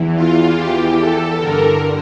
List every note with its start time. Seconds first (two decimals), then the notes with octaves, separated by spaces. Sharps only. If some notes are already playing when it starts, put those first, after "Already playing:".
Already playing: E2 E3
0.15 F4
0.57 G4
0.98 A4
1.39 G2 D3 A#4